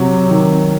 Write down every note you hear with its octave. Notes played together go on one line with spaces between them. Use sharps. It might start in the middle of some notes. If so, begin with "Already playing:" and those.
Already playing: C3 F#3
D#3